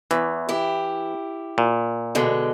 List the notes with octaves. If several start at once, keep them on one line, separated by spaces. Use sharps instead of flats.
E2 E3
E4 G4
A#2
B2 D3 G#3